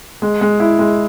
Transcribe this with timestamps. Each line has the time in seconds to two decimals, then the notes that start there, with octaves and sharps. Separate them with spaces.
0.22 G#3
0.41 G#3
0.60 E4
0.79 G#3